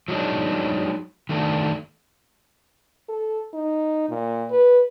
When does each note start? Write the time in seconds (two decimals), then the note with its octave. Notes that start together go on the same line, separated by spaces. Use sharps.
0.08 F3 F#3 G#3 D4 D#4
1.29 D#3 A3 D4
3.09 A4
3.54 D#4
4.09 A#2
4.50 B4